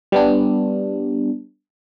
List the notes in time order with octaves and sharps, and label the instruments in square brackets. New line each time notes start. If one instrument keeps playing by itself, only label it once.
[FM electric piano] G3 B3 D4